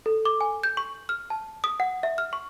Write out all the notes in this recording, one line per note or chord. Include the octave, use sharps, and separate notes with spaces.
A4
D6
G#5
G6
C#6
F6
A5
D#6
F#5
E5
F6
C#6